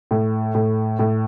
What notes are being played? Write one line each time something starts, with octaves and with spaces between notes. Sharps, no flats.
A2
A2
A2